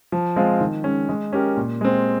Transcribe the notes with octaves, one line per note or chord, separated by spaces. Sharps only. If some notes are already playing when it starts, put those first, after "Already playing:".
F3
G#3 C4 F4
D#3
G#3 C#4
G#3
C#4 G4 A#4
A#2
G#3 C4